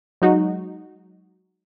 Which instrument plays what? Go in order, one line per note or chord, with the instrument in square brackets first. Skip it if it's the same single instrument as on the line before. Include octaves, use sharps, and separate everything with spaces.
[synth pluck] F#3 G#3 D#4 F#4